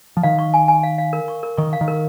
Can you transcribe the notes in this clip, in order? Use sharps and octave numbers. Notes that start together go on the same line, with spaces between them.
F3
D#3 F5
C#6
G#5
G#5
F5
F5
A#4
C#6
A#4
D#3 C#6
F5
D#3
A#4